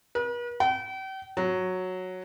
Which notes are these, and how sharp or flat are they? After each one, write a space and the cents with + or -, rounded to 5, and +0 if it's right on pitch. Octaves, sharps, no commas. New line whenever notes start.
B4 -45
G5 -40
F#3 -5